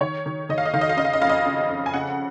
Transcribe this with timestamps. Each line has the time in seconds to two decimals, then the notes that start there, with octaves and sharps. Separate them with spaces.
0.01 D#3 C#5
0.26 D#3
0.49 D#3 D#5
0.58 F5
0.65 D#5
0.74 D#3 F5
0.81 D#5
0.89 F5
0.97 C#3 D#5
1.05 F5
1.13 D#5
1.22 F2 F5
1.29 D#5
1.46 C#3
1.69 F2
1.86 G#5
1.94 C#3 F#5